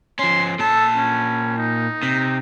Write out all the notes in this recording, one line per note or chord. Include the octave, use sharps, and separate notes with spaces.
F3 C#4 C6
A#2 A4 A5
C#4
D#4
C3